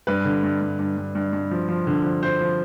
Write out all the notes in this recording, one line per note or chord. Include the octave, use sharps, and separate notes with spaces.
G2 B4
D3
G2
G2
G2
G2
G2
G2
F3
F3
D3
F3
F3 C5
F3